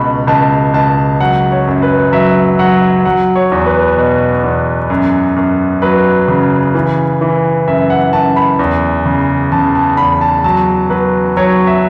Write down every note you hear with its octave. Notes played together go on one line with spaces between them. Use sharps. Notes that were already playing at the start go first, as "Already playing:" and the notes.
Already playing: C#2 B2 B5
C#2 A5
C#2 A5
F#3 F#5
C#5
F#2
B4
F#3 E5
F#3 F#5
F#3 F#5
C#5
E2
B4
B2
E2
F#2
F#2
F#3 B4
C#3
E3
E3
F#2 E5
F#5
F#2 A5
B5
E2
C#3
C#3 A5
A5
E2 B5
A5
F#3 A5
F#3 B4
F#3 C#5
E5